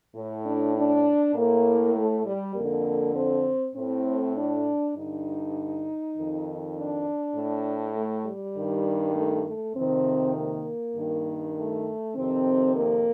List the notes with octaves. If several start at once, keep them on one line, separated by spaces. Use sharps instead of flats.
A2
D4
D4
A2 A#3
A3
G3
F2 D3 A#3
C4
A2 C4
D4
G2 D3 D#4
F2 D#3
D4
A2
A3
G3
G2 D#3
A3
A3
F2 C3 D#3 C4
A#3
G2 D#3
A3
F2 C3 D#3 C4
A#3